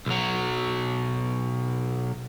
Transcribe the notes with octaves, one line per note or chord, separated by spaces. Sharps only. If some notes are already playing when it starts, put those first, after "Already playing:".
B1 F#3